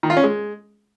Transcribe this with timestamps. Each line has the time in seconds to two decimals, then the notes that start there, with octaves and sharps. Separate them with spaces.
0.03 D#3
0.10 F4
0.17 C#4
0.23 G#3